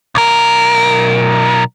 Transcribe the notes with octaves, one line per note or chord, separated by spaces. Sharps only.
B1 A#4